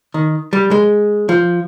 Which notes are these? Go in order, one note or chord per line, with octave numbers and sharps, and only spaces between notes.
D#3
G3
G#3
F3